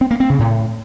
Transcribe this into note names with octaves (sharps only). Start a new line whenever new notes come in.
C4
A#3
C4
C#3
A2